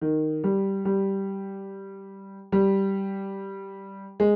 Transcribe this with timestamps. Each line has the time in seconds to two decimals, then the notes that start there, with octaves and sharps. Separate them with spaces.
0.01 D#3
0.44 G3
0.85 G3
2.52 G3
4.20 G#3